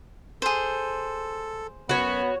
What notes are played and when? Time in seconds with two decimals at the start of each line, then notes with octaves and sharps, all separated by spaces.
0.42 G#4 A4 C5
1.89 F#2 B3 F#4 C#5 B5